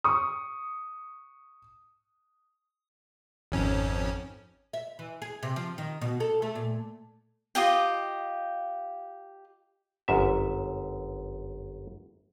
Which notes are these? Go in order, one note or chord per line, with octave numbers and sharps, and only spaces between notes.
C#6 D#6
G#1 F2 C#4
E5
E3
G#4
C3
F3
D#3
B2
A4
A3
A#2
F4 G4 D#5 G5
G1 F#2 E5